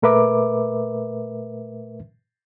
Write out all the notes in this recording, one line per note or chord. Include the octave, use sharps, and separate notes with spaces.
A#2 A3 A#4 B4 E5 D6